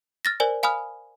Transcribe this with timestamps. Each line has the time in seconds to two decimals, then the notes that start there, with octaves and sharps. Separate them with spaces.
0.25 F6 A6 A#6
0.40 A#4 C5 D5 G#5
0.63 F5 G#5 B5 D#6 F6